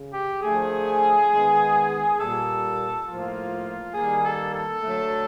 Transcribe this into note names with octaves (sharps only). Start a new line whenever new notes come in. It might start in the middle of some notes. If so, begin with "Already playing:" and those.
Already playing: C#3
G4
D3 F3 A3 G#4
D#3 G#3 B3
A#2 G3 A#3 A4
A2 F3 A#3 F4
D#3 G3 A#3 G#4
A4
A4
D3 F#3 A3